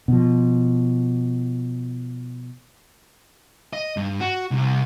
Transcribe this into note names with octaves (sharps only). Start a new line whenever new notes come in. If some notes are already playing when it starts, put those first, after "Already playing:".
B2 F3
D#5
G2
F#4
C2